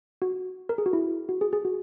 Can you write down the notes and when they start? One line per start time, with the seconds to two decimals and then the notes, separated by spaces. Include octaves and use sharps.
0.22 F#4
0.69 A#4
0.78 G#4
0.86 F#4
0.93 E4
1.29 F#4
1.41 G#4
1.53 G#4
1.65 F#4